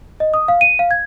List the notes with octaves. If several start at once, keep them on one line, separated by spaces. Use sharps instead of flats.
D#5
D#6
F5
D#7
F5
G#6